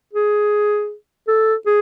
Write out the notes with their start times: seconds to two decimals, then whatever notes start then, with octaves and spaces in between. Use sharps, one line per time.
0.13 G#4
1.28 A4
1.66 G#4